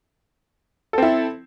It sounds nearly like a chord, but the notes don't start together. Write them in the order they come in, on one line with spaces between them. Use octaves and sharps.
A4 C4 E4